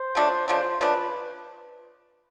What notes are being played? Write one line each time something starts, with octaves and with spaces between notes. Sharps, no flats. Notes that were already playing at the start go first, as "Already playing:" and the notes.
Already playing: C5
C#3 F3 A3 D4
C#3 F3 A3 D4 C5
C#3 F3 A3 D4 B4